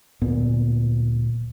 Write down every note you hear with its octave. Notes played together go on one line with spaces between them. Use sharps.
D1 A#2 B3